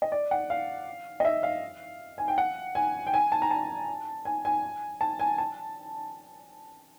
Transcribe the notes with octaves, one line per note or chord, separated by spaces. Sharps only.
D#5
D5
F#5
F5
D#5
E5
F5
G#5
G5
F#5
G#5
G5
G#5
A5
A#5
A5
G#5
G#5
A5
G#5
A5